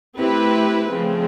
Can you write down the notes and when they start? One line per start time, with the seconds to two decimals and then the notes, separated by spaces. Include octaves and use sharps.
0.18 A3 C4 E4 G4 B4
0.92 C#3 F3 A3 C4